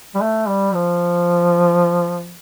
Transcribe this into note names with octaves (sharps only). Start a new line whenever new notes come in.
G3
A3
G3
F3